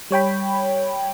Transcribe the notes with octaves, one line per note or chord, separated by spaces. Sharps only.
G3 C#5 G5 B5